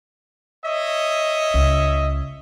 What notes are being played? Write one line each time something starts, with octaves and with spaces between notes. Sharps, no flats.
C#5 D#5 E5
C#2